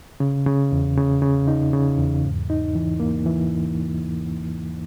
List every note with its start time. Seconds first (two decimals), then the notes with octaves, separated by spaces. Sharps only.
0.20 C#3
0.46 C#3
0.72 E2
0.98 C#3
1.22 C#3
1.47 D#4
1.73 C#3
1.98 E2
2.24 G#2
2.50 D#4
2.75 E3
3.00 A#3
3.26 E3